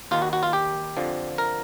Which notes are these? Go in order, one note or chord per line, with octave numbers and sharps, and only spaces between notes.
D#2 D#3 F4
F#4
F#4
F4
G4
F2 D3 F3
A#4